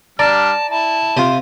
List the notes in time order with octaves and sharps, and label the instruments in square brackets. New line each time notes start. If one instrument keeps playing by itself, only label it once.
[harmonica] G3 D4 F6 [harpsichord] D5 [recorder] A5 [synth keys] A#5
[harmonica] E4 [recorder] A5
[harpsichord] C3 C5 [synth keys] F4 D#7